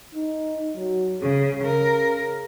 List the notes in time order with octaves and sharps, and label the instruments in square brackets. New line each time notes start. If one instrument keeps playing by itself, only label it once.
[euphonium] D#4
F#3
[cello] C#3 [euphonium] G#4
[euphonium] C#3 [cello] A#4